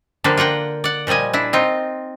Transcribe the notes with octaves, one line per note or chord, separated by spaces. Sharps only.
D3 F3 G3 A#3 D4
F4 A#4 F#5 G5
D5 F#5
A#2 F3 G3 D#5 G#5
D4 E4
C4 D#4 F4